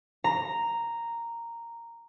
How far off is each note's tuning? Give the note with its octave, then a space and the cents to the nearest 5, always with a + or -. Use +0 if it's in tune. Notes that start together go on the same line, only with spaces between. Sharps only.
A#5 -5